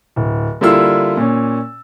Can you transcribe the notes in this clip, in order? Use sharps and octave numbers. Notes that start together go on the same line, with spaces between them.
D1
D3 G3 A#3 E4 F4 E6
A#2 C#4